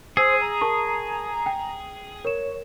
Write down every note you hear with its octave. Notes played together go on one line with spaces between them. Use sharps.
G#4 C5 E6
A#5
A#4 A5 C#6
G5
A#4 C#5 E7